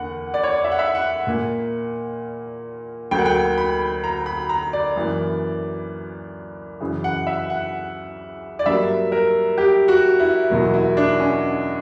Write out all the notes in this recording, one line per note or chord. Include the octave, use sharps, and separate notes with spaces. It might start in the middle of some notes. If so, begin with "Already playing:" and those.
Already playing: E2 D3 A#3 F#5
D5
C#5
D5
E5
F#5
E5
F#5
A#2 A#3
D2 D3 F#3 A#3 G5
F#5
G5
B5
A#5
B5
A#5
D5
F#2 E3 A#3
F#2 C#3 E3
F#5
E5
F#5
D5
G2 F#3 A#3 E5
A#4
G4
F#4
E4
E2 B2 F#3 A#3
E4
D4
C#4